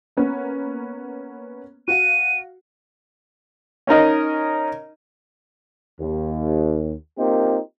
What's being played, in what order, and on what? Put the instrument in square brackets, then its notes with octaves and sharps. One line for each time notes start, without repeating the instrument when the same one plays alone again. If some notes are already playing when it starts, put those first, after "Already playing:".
[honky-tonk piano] A#3 B3 C#4
[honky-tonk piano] F#4 F5 [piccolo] D#7
[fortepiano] C#4 D#4 A#4 D#5
[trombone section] D#2
A#3 C4 D#4 F4 G4 A#4